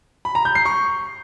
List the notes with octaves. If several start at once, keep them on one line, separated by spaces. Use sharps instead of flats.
B5
A#5
G6
C7
C#6